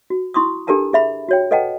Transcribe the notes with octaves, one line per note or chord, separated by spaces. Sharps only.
F#4
E4 C6 C#6 D#6
D4 G4 A4 A#4 A5 A#5
G#4 E5 B5
F#4 C#5 G5
A4 B4 D#5 F#5 G5 A5